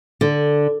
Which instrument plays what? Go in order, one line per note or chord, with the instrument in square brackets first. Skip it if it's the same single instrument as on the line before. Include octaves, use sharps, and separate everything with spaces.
[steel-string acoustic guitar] D3